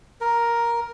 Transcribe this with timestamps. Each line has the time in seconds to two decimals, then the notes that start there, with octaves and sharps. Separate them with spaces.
0.21 A#4